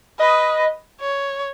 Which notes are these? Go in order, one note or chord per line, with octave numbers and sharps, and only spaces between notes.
B4 D#5
C#5